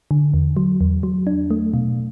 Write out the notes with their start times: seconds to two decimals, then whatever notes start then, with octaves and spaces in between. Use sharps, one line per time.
0.11 D3
0.34 E2
0.57 F#3
0.81 E2
1.03 F#3
1.27 D4
1.51 A3
1.74 B2